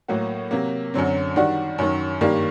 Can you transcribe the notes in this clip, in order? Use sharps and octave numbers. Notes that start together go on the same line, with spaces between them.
A2 F#3 A#3 F#4
C3 F#3 A#3
F#2 D3 F#3 C4
D#3 G3 D4 F#4
F#2 D#3 F#3
G2 D#3 G3 A#3